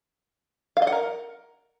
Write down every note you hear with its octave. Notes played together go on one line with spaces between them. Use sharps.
F5
D#5
F#5
A#4